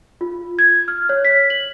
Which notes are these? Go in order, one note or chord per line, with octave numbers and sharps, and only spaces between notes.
F4
G#6
F6
C#5
B6
F#7